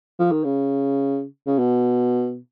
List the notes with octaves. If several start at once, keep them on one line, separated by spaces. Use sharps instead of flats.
F3
D#3
C#3
C#3
B2